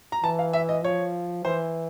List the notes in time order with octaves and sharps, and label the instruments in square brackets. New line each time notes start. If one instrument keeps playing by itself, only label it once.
[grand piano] A#5
[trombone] E3 [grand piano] A5
[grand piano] F5
E5
D#5
[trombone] F3 [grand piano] C#5
[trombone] E3 [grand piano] C5